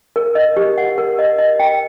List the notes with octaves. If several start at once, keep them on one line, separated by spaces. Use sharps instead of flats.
A#4
D#5
G4
F#5
A#4
D#5
D#5
G5